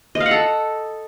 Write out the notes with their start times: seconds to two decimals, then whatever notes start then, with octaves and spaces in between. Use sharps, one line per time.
0.15 D#5
0.20 F5
0.26 F#5
0.31 A4